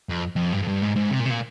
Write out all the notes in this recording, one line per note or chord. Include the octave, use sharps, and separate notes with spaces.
F2
F2
G2
F2
G2
G#2
G#2
C3
A#2
C3
A#2